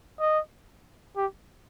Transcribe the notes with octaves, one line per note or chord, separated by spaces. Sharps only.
D#5
G4